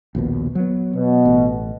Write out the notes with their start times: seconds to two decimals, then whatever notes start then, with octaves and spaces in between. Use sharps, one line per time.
0.15 A#1 D#2 B2
0.55 F#3 B3
0.94 B2
1.25 A1